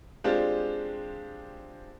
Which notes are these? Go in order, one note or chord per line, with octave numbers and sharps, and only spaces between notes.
G#3 C4 D4 F4 G4